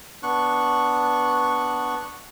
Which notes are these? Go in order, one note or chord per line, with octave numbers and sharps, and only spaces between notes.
B3 D4 C#6 F#6